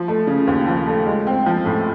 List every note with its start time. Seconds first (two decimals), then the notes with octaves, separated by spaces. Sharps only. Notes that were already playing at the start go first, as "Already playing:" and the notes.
Already playing: F3
0.08 A3
0.27 C#3
0.47 D#2
0.67 F3
0.87 A3
1.06 G#3
1.27 C4
1.46 F3
1.66 A2